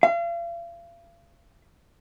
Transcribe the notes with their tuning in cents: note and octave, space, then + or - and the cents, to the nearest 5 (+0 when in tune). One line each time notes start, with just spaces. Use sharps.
F5 -40